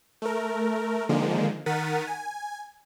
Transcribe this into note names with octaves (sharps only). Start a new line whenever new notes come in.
A3 A#4
D3 D#3 F3 G#3 A#3
D#3 A#4 F#5 A6 B6 D#7
G#5